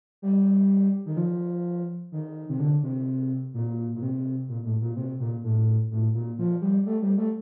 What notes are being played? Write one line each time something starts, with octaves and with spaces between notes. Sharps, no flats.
G3
D#3
F3
D#3
C3
D3
C3
A#2
A#2
C3
A#2
A2
A#2
C3
A#2
A2
A2
A#2
F3
G3
A3
G3
A3